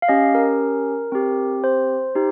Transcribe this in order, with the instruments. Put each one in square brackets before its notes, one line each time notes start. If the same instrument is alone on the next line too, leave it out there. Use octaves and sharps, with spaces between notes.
[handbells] F5
C#4 G4 D#5
A#4
C4 G4
C5
D#4 G4